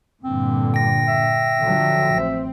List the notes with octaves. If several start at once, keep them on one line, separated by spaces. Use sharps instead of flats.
G2 A#2 D3 C4
G5 A#6
E5
D3 F3 F#3
A1 C4